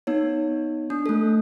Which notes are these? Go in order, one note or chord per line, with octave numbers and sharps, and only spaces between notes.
B3 D#4 C#5
D4
A3 A4